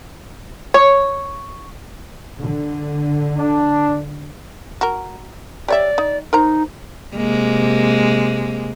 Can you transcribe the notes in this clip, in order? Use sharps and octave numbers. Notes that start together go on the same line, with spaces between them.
C#5
D3
D4
F#4 A#4
G4 C#5 D5 E5
D#4
D#4 A#4 C5 A#5
C3 G#3 A#3